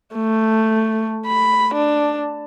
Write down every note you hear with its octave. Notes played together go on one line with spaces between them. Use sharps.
A3
B5
D4